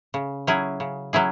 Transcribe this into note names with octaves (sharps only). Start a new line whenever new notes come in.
C#3
F#3 C#4 E4 G#4
C#3
F#3 C#4 E4 G#4